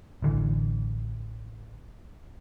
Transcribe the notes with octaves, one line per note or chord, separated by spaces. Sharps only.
A1 D3 E3